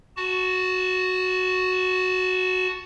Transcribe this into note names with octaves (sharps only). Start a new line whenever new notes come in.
F#4 A5